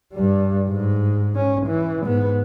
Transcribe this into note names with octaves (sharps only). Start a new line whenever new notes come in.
G2 G3
G#2
C#4
E3
G#2 B3